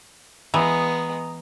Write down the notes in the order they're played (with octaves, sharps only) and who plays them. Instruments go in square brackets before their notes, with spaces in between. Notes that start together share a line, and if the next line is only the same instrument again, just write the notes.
[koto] E3 [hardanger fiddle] G#3 B3 [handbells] A#5 D#6